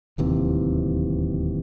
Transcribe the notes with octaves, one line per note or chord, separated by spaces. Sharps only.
D1 D#2 C3 E3